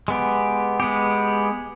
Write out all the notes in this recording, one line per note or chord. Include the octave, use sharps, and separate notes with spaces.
G#3 B3 G4
G#3 B3 G4